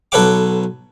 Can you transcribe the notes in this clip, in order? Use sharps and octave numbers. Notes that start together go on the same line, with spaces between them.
B1 A4 B4 C#5 F#5 D6